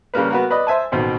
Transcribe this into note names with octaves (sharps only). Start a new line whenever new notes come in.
C#3 G3 A#3 B4
B3 F#4 A#4
B4 D5 D#5 B5 D#6
C5 E5 G#5 A5
A1 B2 D#3 C4